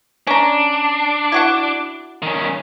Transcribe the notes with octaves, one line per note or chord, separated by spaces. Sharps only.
C#4 D4 A#5
E4 F#4 F#5
D#3 C#4